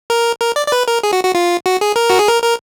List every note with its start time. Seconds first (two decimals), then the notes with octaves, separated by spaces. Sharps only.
0.10 A#4
0.40 A#4
0.56 D5
0.67 D5
0.72 B4
0.88 A#4
1.03 G#4
1.13 F#4
1.24 F#4
1.35 F4
1.66 F#4
1.81 G#4
1.96 A#4
2.10 F#4
2.19 G#4
2.28 A#4
2.44 A#4